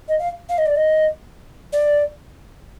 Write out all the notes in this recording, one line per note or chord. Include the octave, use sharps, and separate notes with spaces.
D#5
F5
F5
D#5
D5
D#5
D5